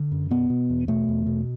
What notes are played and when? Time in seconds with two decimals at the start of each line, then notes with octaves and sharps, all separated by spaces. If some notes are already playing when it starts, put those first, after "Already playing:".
Already playing: D3
0.12 F#2
0.31 B2 B3
0.50 B2
0.70 E2
0.88 B2 A3
1.08 E2
1.27 B2